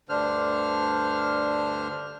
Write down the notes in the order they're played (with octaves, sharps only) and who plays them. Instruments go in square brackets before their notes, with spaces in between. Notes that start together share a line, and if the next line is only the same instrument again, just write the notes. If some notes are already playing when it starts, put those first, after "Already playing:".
[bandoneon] D2 G2 D3 D4 C5 F6